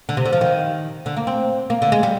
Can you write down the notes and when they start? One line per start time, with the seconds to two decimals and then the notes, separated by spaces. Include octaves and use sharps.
0.09 D3
0.17 C3
0.25 D3
0.33 F3
0.41 D#3
1.06 D3
1.17 A#3
1.27 C4
1.70 A#3
1.82 D3
1.92 G#3
2.03 G3